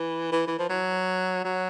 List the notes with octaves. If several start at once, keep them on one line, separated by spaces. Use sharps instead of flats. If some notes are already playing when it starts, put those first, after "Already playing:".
Already playing: E3
E3
E3
F3
F#3
F#3